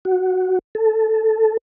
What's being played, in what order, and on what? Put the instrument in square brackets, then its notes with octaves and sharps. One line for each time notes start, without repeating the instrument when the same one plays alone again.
[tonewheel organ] F#4
A4